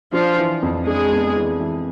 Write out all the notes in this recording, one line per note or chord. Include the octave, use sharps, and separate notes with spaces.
F3 D4 F4
E3
F2
G#3 D4 G#4
B3
E3
E3